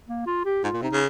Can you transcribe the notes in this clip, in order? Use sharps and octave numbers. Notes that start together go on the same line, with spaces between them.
A#3
F4
G4
G#2 F4
A#2
C3 D#4
C#3